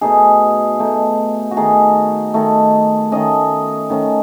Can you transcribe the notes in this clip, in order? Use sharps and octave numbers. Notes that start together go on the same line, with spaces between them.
B2 A3 D#4 G#4
B2 A3 D#4
F#4
D#3 A3 D#4 G#4
D#3 A3 D#4
D#3 A3 C#4 D#5
D#3 A3 C#4